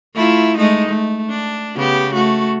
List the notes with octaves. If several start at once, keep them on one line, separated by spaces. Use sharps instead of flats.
A3 E4 F4
G#3 A3 D#4
A3
D4
C#3 B3 G4
A3 F#4